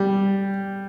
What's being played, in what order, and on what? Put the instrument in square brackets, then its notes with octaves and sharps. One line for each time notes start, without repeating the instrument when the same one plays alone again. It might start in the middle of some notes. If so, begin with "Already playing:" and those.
Already playing: [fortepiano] G3